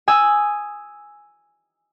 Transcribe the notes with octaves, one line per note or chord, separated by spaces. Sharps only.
G#5 D#6 E6